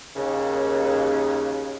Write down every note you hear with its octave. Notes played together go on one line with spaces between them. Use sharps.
D#2 C#3